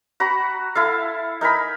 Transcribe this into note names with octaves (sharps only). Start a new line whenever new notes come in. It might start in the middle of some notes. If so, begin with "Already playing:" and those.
F#4 A#5 B5
E4 A4 F5
D#4 A#4 G#5 B5